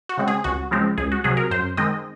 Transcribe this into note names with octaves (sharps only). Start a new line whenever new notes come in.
F#4
C#3 G#3 C4
G#4
C#2 F#4
C#3 F3 G#3 C4
C#2 G#4
F#4
C3 F#3 G#4
A#4
F#2 C5
D#3 G#3 C4 D#5